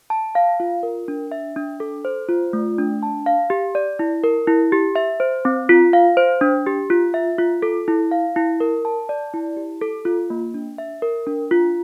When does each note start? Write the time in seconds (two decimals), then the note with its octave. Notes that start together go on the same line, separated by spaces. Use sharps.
0.10 A5
0.35 F5
0.60 F4
0.83 A#4
1.08 D4
1.32 E5
1.56 D4
1.80 A4
2.05 C5
2.29 F4
2.53 A3
2.78 D4
3.03 A5
3.26 F5
3.50 G4
3.75 D5
3.99 E4
4.24 A#4
4.47 E4
4.72 G4
4.96 E5
5.20 C5
5.45 C4
5.69 F4
5.93 F5
6.17 C5
6.41 D4
6.66 G4
6.90 F4
7.14 E5
7.38 F4
7.62 A4
7.88 E4
8.11 F5
8.36 E4
8.60 A#4
8.85 A5
9.09 D5
9.34 E4
9.57 G4
9.81 A4
10.05 F4
10.30 A#3
10.54 D4
10.78 E5
11.02 A#4
11.27 D4
11.51 F4